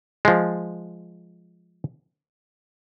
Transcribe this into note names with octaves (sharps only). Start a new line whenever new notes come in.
F3 G#3